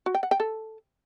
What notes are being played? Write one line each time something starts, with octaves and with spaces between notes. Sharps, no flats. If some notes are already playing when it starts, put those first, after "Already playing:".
F#4
G5
F#5
G5
A4